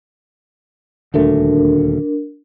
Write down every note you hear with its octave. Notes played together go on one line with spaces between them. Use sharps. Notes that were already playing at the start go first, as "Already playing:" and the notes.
D#1 D2 A3 D4 A#4